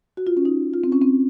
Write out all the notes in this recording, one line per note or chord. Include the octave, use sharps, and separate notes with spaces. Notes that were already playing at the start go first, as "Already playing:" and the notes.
F#4
F4
C#4
D#4
F4
C4
C#4
C4